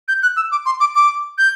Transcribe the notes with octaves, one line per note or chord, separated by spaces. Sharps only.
G6
F#6
E6
D6
C6
D6
D6
G6